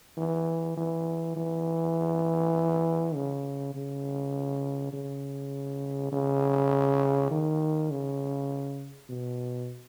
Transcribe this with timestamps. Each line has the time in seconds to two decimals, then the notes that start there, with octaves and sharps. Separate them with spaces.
0.17 E3
0.77 E3
1.36 E3
3.15 C#3
3.74 C#3
4.93 C#3
6.12 C#3
7.31 D#3
7.91 C#3
9.09 B2